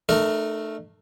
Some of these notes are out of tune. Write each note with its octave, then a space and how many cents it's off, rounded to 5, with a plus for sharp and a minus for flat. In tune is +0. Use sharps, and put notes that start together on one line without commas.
A3 +0 D#4 -45 A#4 +0